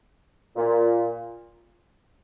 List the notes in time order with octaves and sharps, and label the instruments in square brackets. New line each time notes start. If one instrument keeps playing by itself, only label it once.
[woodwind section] A#2